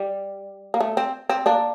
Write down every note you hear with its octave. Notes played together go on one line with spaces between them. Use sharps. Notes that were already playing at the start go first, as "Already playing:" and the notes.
Already playing: G3
A#3
A3
C4
C4
A#3 D4